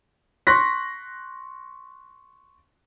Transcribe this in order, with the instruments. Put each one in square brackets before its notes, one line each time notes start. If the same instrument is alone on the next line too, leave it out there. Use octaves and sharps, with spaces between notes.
[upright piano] C6 C#6 F#6 A#6 B6